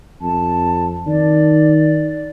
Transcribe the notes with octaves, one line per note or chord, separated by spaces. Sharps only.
F2 A5
D#3 D5